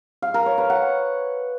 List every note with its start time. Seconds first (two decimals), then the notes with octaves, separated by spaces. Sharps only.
0.22 F5
0.34 A#4
0.46 C#5
0.58 B4
0.70 F#5